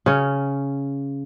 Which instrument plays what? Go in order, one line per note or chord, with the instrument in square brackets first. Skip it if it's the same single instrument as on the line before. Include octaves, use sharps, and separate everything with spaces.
[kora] C#3 C#4